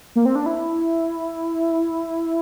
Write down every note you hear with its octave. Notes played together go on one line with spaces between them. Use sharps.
A#3
C4
D4
E4